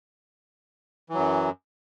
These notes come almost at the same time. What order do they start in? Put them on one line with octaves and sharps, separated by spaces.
E3 F#3 F#2